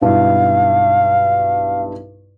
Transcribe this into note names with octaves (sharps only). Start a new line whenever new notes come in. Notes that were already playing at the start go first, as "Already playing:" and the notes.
B1 G2 E4 F5